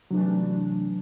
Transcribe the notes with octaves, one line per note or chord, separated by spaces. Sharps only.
C3 E3 F#3 A3 D4